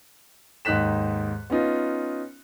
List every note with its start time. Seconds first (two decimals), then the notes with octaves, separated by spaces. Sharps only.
0.65 D#2 G#2 D#4 F#6 B6 E7
1.50 B3 C#4 D#4 F4